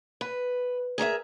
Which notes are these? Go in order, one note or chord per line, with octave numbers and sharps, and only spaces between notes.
B4
G#4 A#4 C#5 E5